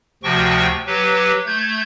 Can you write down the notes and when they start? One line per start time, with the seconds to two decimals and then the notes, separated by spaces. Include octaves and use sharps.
0.23 D2 C3 F3 F#4 G5 C#6
0.86 F#3 G4 B4
1.46 A3 G6 G#6